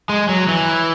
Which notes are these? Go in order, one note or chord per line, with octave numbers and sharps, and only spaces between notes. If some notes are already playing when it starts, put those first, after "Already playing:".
G#3
F#3
E3